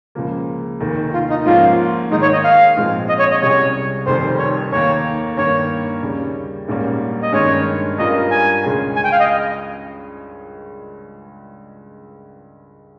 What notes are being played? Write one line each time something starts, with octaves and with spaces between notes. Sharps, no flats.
C#2 C#3 F3 A#3
F1 D#2 D#3
F4
D#4
G#2 F3 A#3 C#4 F4
G#2 D#3 G#3 D#4
C#5
D#5
F5
A#1 G#2 F3 G#3 C4
D#5
C#5
D#5
C2 C3 G3 C#4 G#4 C#5
F1 F2 D#3 G3 C5
C#5
D#2 D#3 A#3 C#5
G2 D#3 A#3 C#5
D#2 C#3 G3 C#4
A#1 G#2 G3 A#3 C#4
D#5
G2 D#3 G#3 C#4 C#5
G2 G3 C#4 F4 A#4 D#5
G#5
C#2 C#3 G#3 C#4 G#4
G#5
G5
F5
D#5